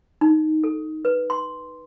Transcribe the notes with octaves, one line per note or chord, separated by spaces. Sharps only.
D#4
A4
B4
C6